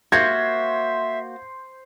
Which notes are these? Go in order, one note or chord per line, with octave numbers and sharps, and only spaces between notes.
A#3 F#4 C5 E5 G#6